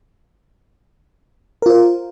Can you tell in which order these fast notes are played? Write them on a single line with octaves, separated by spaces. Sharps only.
A#4 F4 C5